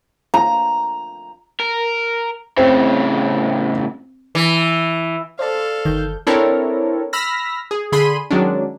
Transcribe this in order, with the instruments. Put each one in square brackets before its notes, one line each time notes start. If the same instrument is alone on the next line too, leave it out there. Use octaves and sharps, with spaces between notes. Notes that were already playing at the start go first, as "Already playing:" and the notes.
[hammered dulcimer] A#5
[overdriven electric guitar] A#4
[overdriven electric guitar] A2 C#3 [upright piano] C4
[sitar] E3
[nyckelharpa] A4 F5 [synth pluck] C5 D5 A5
[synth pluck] G1 G6 [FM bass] D#3
[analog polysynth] C4 D4 E4 A4 A#4 C#5
B5 E6 F6 A#6 B6
G#4
D3 G#4 B5 C6 D#7
D#3 F#3 G#3 C#4 D4